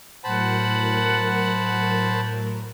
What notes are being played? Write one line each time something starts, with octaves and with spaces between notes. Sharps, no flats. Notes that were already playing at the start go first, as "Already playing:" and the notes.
A2 F#3 A#4 C5 F#5 A5 B5